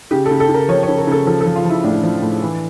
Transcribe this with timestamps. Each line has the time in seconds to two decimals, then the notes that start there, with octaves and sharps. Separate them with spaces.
0.11 C#3 G4
0.26 A4
0.31 C#3
0.40 A4
0.49 C#3
0.54 A#4
0.68 F3 C#5
0.83 C#5
0.88 C#3
0.98 A#4
1.07 C#3 A4
1.26 F3 A4
1.41 A4
1.46 F3
1.56 F4
1.65 F3 E4
1.84 A2 D4
2.03 F3
2.22 A2
2.42 E3